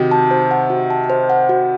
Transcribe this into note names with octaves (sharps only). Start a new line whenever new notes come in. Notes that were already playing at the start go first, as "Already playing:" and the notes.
Already playing: C3 D#3 F#4
A5
C5
F#5
F#4
A5
C5
F#5
F#4